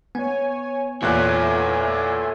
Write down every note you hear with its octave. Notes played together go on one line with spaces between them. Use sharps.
B3 C#5 G#5
E2 A#2 A4 C#5 E5 G#5 F#6